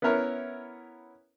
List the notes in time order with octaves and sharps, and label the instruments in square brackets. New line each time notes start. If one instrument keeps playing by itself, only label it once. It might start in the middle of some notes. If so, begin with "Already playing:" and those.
[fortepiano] B3 C#4 E4 A#4 C#5